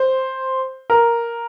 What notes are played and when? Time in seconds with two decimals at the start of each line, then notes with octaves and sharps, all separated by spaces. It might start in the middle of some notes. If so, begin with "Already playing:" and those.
Already playing: C5
0.90 A#4